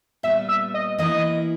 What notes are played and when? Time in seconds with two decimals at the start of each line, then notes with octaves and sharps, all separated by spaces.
0.23 A#2 G3 B3 E5
0.49 E5
0.74 D#5
0.98 E3 A#3 E4 D#5